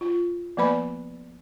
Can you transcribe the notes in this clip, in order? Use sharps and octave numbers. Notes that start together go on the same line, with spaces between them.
F4
F3 A#3 B3 B4 D5 B5